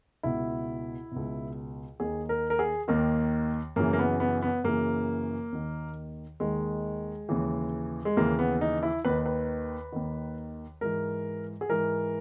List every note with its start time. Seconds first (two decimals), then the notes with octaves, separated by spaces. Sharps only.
0.23 C#2 B2 E4
1.11 C#2 B2
2.00 D#2 D#3 G#4
2.29 A#4
2.50 A#4
2.59 G#4
2.88 D#2 D#3 A#3
3.76 F#2 C#3 E3 A#3
3.93 A#3
3.99 B3
4.20 B3
4.42 B3
4.64 F#2 C#3 E3 A#3
5.52 D#2 D#3
6.40 D#2 D#3 G#3
7.29 D#2 C#3 E3
8.05 G#3
8.17 D#2 C#3 E3 A#3
8.39 B3
8.61 D#4
8.83 E4
9.05 D#2 D#3 B4
9.26 B4
9.92 D#2 D#3
10.81 G#2 E3 A#4
11.61 G#4
11.70 G#2 E3 A#4